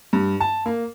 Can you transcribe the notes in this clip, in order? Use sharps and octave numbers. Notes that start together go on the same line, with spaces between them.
G2
A5
A#3